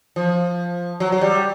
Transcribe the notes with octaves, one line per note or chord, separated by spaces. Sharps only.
F3
F#3
F#3
G3